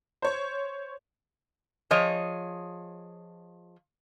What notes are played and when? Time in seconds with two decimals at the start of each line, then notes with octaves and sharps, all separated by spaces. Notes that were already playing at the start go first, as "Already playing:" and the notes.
0.22 C5 C#5
1.91 F3 G#4 C#5 D#5